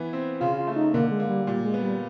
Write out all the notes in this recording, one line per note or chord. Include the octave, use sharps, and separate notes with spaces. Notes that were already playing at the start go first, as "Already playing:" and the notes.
Already playing: E3 B3
C4
C#3 F4
F4
A3
D#4
D3 A#3
G#3
A#3
G3
A#2 G3
G#3
B3
G3